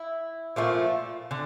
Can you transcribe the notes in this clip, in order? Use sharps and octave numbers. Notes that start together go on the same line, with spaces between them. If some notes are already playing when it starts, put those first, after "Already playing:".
Already playing: E4
A#2 F3 A3
D3